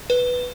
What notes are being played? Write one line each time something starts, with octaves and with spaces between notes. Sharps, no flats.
B4